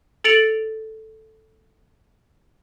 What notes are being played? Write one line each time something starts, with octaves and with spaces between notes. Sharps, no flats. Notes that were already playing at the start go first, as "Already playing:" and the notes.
A4 A6 C#7 D7 F7 F#7